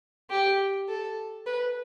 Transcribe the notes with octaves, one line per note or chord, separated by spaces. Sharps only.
G4
A4
B4